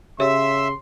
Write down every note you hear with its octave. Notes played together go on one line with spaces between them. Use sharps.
C#3 G4 C#5 E5 C6